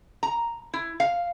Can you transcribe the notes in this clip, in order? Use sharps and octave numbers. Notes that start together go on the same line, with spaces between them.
A#5
E4
F5